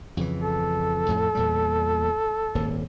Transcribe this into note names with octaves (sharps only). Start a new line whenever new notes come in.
F2 C#3 E3
A4
F2 A2
E2 A#2 G3
D#1 G#1 A#3